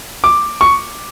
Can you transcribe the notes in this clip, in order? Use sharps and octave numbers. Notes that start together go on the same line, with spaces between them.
D6
C#6